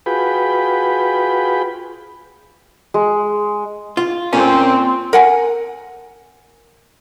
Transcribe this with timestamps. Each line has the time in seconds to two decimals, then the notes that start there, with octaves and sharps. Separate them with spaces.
0.06 F4 F#4 G#4 B4 G5 B5
2.94 G#3
3.97 F4
4.33 A#2 C4 C#4
5.13 A#4 F#5 G#5